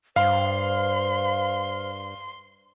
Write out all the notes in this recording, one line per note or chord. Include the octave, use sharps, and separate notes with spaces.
G2 C5 F5 C6